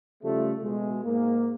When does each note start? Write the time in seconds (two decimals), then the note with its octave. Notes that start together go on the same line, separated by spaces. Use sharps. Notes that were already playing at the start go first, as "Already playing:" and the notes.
0.23 C#3 F3 G3 A3
0.62 B2 G#3
1.05 G#2 A#3